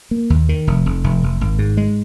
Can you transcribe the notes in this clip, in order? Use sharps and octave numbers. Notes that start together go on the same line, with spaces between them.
A#3
D#2
D#3
F1
F1
F1
F1
G#1
G#2
G#3